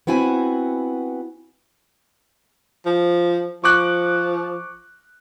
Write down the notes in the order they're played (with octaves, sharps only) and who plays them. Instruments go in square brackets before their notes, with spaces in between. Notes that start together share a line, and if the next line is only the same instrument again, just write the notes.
[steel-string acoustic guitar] B3 C4 E4 F#4 G#5
[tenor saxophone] F3
[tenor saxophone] F3 [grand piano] C#6 D6 F#6